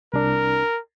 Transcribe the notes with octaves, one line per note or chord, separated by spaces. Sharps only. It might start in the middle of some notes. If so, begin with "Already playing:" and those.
C2 D4 A#4